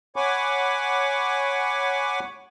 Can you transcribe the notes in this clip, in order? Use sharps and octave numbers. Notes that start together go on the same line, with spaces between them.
C#5 F#5 G#5 B5 C#6 D6